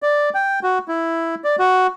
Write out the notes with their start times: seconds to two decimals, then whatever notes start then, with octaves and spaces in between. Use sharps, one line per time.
0.03 D5
0.34 G5
0.63 F#4
0.88 E4
1.44 D5
1.59 F#4